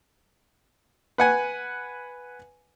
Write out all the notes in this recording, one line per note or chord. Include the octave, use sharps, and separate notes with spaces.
B4 F#5 G#5